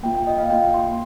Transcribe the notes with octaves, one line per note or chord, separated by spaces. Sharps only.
A#3 F4 G5
G5
D#5
F5
A#3 F4 G5
C6